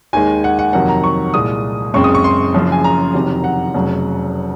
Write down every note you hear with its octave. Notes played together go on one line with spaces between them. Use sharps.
D#2 D#3 G#3 G#5
F#5
F#5
F2 C3 D#3 F#3 A#3 F#5
A#5
C#6
C2 A#2 G#3 D#6
F#1 F#2 C#3 G#3 C4 C#6
D#6
C#6
C6
F#1 F#2 C#3 F3
G#5
A#5
F#1 F2 C3 D#3 F#3
F#5
F1 F2 C#3 F#3